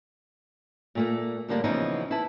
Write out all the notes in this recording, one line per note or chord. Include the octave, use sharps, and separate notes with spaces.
A#2 A3 A#3
A2 D3 G3 A#3 D4
C#3 E3 F3 B3 D#4
E4 B4 A5